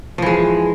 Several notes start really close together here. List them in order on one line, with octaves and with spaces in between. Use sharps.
F3 E3 G#3